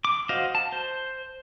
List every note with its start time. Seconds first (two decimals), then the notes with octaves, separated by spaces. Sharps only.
0.05 D6
0.29 F#4 C5 D#5 F5
0.55 A5
0.72 C5